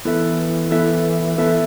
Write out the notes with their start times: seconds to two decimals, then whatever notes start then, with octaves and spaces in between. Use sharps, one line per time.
0.05 E3 B3 E4 A4 E5
0.71 B3 E4 A4 E5
1.38 B3 E4 A4 E5